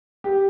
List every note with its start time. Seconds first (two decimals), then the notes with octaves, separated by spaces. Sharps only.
0.24 G4